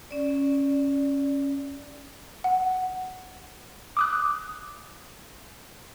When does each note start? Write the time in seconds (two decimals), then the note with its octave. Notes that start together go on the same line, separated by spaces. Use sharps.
0.11 C#4 D5
2.44 F#5
3.97 D6 D#6 F#6